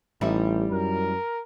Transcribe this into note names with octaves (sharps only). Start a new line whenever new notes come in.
A1 G3 D#4 E4
F#2 A#4